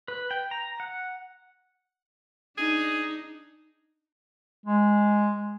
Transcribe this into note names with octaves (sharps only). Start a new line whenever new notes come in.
B4
G5
A#5
F#5
D4 D#4 G#4
G#3